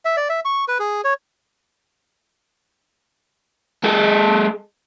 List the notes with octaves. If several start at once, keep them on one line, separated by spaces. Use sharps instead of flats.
E5
D5
E5
C#6
B4
G#4
C#5
G#3 A4